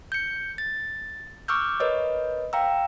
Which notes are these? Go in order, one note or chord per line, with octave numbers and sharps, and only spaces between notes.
G6 C#7
A6
C#6 D6 E6 F6 G6
A#4 B4 C#5 D#5
F5 G5 A#5 E6